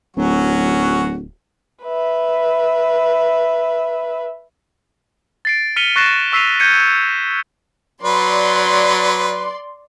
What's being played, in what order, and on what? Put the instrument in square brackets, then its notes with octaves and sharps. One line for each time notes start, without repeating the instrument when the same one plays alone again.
[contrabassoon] D1 [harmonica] F#3 C#4 F#4
[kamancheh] B4 E5
[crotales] A6 C7 D7
F6 B6 C#7 D#7 F7 G7
C#6 F#6 A6 A#6 C7 E7
C#6 E6 B6 C7 D#7 F7
G6 G#6 C#7 D#7 G7
[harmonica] F#3 B4 [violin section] D5 C6